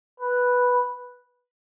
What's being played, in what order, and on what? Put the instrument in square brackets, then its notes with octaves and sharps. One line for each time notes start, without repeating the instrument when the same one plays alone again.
[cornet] B4